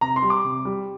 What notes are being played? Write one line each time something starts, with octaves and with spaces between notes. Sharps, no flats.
C3 A#5
C6
G3
D6
C3
G3